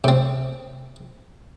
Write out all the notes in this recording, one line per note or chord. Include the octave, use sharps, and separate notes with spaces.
C3 C4